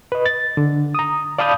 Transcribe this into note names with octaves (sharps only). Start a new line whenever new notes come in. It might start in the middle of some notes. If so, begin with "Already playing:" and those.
B4 D#5
A6
D3
A#5 D#6
D5 F5 A5 B5 D#6 G6